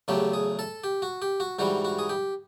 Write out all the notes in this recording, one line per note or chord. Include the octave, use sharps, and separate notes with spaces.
E2 C#3 F#3 A3 G4
G#4
A4
G4
F#4
G4
F#4
G#2 E3 G3 F#4
F#4
G#4
G4